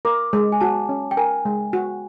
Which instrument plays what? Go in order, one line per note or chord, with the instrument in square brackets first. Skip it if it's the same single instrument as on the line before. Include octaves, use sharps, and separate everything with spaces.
[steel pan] A#4 [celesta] D6
[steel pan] G#3
[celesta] G#5
[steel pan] F#4 [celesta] A5
[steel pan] C#4
[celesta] G5
[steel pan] A#4 [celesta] G#5
[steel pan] G#3
F#4